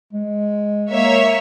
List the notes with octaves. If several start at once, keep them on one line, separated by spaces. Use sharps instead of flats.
G#3
A#3 C#5 E5